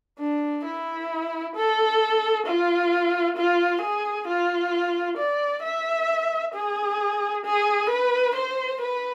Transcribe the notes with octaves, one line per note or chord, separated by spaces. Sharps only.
D4
E4
A4
F4
F4
G#4
F4
D5
E5
G#4
G#4
B4
C5
B4